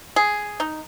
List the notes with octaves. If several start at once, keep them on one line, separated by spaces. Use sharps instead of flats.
G#4
D#4